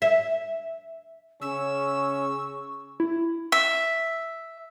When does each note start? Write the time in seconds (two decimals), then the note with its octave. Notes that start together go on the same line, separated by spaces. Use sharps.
0.02 E5
1.41 C#3 C#4 C#6 E6
3.00 E4
3.52 E5